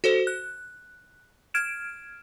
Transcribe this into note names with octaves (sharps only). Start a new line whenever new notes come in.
F#4 A4 C5
F#6
F6 G#6 D7 E7